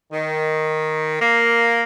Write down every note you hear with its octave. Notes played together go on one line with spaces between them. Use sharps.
D#3
A#3